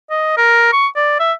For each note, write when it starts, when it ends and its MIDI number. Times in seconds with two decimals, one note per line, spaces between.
0.10 0.35 75
0.37 0.71 70
0.73 0.87 85
0.96 1.16 74
1.20 1.33 76